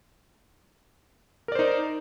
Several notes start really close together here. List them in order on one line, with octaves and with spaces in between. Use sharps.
A#4 D5 C5 D#4